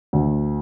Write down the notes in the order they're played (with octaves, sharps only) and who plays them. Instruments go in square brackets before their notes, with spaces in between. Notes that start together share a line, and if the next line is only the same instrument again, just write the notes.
[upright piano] D2